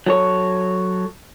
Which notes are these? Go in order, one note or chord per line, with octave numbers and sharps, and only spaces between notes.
F#3 A4 C#5